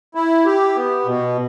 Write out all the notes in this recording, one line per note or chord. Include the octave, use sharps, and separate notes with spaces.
E4
G4
B3
B2